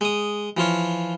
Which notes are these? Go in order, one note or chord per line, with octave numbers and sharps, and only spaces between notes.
G#3 D#6
E3 F3 F4 C#5